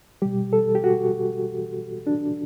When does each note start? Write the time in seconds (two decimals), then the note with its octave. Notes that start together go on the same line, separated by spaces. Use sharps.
0.22 B2 G3 G4
0.53 A4
0.75 G4
0.84 F#4
2.07 D4